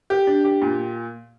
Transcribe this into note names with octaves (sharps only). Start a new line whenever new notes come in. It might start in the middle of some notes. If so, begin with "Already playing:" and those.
G4
D4
G4
A#2